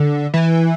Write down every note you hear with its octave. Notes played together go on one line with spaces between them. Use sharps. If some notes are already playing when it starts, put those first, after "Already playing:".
Already playing: D3
E3